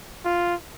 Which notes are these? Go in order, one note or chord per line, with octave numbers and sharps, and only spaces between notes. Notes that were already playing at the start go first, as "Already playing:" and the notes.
F4